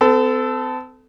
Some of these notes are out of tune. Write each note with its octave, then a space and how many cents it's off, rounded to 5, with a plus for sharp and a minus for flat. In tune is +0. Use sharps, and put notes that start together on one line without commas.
C4 -45 A4 +0